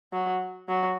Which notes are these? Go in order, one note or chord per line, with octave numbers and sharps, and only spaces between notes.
F#3
F#3